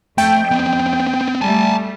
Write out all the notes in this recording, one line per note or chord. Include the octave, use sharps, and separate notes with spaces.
F2 A3 G5
B3 C4
G3 A3 G#5 A5